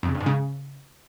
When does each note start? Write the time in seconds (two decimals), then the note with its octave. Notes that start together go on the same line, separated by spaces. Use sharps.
0.03 F2
0.09 C#3
0.15 G2
0.20 G#2
0.26 C#3